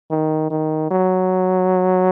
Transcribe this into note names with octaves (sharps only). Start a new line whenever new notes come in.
D#3
D#3
F#3